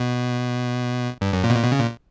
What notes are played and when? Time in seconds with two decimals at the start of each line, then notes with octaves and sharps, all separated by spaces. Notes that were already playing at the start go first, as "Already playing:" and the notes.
Already playing: B2
1.21 G2
1.33 F#2
1.44 A#2
1.50 B2
1.55 A#2
1.63 B2
1.72 C#3
1.79 A#2